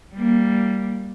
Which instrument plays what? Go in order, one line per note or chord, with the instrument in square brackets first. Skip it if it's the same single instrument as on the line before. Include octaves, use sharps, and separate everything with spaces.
[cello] G3 A#3